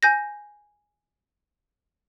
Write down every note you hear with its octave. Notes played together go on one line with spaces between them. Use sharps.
G#5 G6 A#6